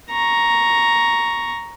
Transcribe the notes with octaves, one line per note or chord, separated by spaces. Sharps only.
A#5 C#6